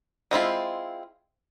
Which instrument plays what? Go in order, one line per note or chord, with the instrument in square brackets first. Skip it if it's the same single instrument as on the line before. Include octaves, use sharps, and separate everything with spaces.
[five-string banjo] G#3 C4 E4 F4